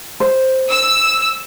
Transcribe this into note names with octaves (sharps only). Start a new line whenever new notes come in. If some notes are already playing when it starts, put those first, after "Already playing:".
C5
E6